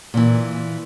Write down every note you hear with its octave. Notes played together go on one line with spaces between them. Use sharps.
A#2 E3